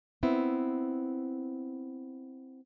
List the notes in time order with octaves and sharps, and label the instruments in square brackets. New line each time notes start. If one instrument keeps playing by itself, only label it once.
[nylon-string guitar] B3 C4 E4